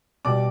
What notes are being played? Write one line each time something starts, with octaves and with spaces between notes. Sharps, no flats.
B2 G3 D5 D6